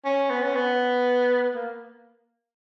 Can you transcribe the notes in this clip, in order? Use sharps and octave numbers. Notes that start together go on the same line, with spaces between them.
C#4
B3
C#4
B3
A#3